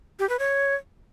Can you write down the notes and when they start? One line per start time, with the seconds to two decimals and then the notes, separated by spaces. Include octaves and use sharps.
0.19 G4
0.29 B4
0.39 C#5